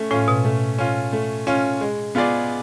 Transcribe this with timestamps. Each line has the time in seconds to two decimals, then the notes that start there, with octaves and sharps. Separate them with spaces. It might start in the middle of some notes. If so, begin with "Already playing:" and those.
Already playing: A3 C#4
0.11 A2 C#4 F4
0.28 B2
0.45 A3
0.79 C#4 F4
1.13 A3
1.47 C#4 F4
1.81 G#3
2.15 B3 F4 G#4 D5